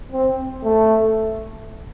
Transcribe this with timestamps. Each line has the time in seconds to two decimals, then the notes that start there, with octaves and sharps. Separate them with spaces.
0.12 C4
0.64 A3